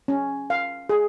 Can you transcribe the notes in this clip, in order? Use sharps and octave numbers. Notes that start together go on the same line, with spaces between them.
C#4
F5
G#4